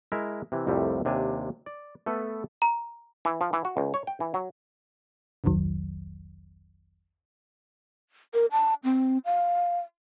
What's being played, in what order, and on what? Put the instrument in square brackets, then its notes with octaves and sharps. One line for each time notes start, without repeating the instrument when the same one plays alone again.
[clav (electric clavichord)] G#3 E4 A#4 E5
C3 E3
C2 F2 A2 C3 G3 A3
D#2 C3 D4 G#5
D5
A3 B3 A4 B4
[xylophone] A#5
[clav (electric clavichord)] E3
F3
E3
F#4
C#2
C#5
G5
E3
F#3
[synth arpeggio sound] G1 C2 F2 D#3 F#3
[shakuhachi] A#4
A5
C4
F5